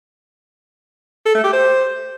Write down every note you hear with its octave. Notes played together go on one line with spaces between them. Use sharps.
A4
A3
G4
C5